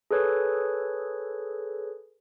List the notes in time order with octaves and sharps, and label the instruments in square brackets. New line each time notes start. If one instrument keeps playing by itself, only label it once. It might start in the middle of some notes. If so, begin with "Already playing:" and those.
[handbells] G#4 A4 B4 C#5